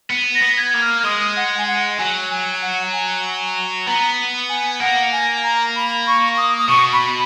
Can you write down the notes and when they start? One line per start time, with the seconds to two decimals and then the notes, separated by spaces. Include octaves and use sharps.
0.10 B3
0.35 A#6
0.42 B3
0.57 G#6
0.74 A#3
0.81 F6
1.04 G#3 D#6
1.36 F#5
1.58 G#5
1.67 F#5
1.98 F#3 G#5
2.30 G#5
2.62 F#5
2.92 G#5
3.87 B3 A#5
4.49 G#5
4.80 A#3 F#5
5.12 G#5
5.43 A#5
5.76 B5
6.07 C#6
6.37 D#6
6.58 D#6
6.69 B2 C#6
6.93 B5